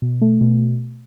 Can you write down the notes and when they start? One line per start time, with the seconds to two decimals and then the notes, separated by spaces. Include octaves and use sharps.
0.02 B2
0.21 A3
0.41 B2